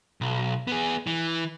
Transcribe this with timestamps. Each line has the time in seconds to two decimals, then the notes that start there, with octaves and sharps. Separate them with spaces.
0.21 B1
0.67 B3 G#4
1.07 E3